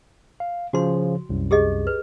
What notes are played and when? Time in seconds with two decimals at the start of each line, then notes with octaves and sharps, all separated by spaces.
0.40 F5
0.73 C#3 F3 F#4 C6
1.29 C2 F#2
1.51 G4 G#4 D#5
1.87 B4